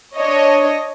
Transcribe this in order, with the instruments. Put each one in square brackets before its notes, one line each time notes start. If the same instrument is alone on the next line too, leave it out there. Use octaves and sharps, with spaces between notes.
[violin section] D4 C#5 D#5